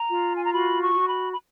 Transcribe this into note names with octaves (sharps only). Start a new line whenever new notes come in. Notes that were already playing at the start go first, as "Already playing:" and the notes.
Already playing: A#5
F4
G#5
A#5
F#4 B5
C#6
F#4
B5
B5